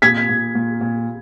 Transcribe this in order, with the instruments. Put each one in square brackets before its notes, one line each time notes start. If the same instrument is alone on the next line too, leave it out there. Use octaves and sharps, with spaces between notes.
[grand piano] A#2 [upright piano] G#6 B6
[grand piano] A#2
A#2
A#2